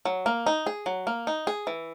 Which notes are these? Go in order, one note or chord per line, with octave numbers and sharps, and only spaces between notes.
F#3
A#3
D#4
G#4
F#3
A#3
D#4
G#4
E3